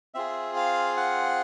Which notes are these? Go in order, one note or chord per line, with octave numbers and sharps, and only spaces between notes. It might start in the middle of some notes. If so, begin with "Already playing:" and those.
C4 F4 G#4 E5
F5
F#5